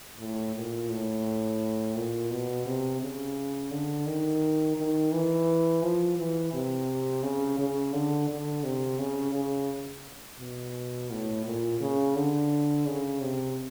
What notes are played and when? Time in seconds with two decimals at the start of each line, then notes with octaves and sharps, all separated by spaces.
0.20 A2
0.55 A#2
0.90 A2
1.96 A#2
2.31 B2
2.66 C3
3.01 C#3
3.71 D3
4.07 D#3
4.77 D#3
5.12 E3
5.83 F3
6.18 E3
6.53 C3
7.23 C#3
7.59 C#3
7.93 D3
8.29 D3
8.64 C3
8.99 C#3
9.34 C#3
10.39 B2
11.11 A2
11.45 A#2
11.81 C#3
12.16 D3
12.86 C#3
13.21 C3